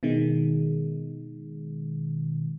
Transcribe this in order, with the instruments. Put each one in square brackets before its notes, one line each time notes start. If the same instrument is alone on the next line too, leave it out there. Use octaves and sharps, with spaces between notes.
[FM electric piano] B2 D#3 G#3